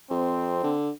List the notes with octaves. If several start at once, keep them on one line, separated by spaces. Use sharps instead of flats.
F2 C4
D3